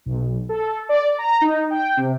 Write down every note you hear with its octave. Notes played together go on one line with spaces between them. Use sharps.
B1
A4
D5
A#5
D#4
G5
C3